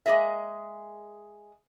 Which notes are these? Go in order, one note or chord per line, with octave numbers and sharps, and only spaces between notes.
G#3 A#3 G#4 D#5 E5